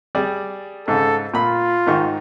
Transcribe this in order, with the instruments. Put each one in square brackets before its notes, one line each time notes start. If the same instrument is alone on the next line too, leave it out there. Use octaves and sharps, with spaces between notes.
[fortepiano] G3 G#4 D5
[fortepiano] G#2 C#3 [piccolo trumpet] A4
[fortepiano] A#2 B5 [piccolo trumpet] F4
[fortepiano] G#2 D#3 C#6